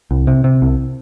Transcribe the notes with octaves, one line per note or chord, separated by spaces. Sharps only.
C2
C3
C3
C2